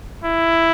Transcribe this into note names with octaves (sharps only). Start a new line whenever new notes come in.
E4